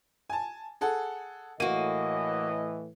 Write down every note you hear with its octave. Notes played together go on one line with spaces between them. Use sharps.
G#5 A5
G#4 A4 F#5
A2 E3 A#3 F#4 D#5 D#7